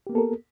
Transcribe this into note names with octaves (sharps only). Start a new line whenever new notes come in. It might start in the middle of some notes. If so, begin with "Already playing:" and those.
A#3 B3 G4 A4 A#4